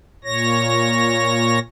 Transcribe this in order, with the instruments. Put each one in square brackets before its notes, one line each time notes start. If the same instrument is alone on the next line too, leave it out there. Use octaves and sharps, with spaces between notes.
[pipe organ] A#2 C#5 A#6